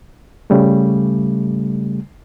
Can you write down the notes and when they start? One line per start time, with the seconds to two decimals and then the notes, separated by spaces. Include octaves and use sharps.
0.50 C#3 G3 A3